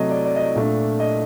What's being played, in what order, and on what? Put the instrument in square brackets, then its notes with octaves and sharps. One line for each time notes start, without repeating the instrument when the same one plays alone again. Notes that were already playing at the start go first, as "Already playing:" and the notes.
Already playing: [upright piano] C3 F#3 A3 D#5
D5
D5
D#5
D5
A#2 A3 D4
D#5